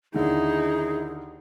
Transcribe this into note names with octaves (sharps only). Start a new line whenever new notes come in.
D#2 D3 D#3 D#4 E4 G#4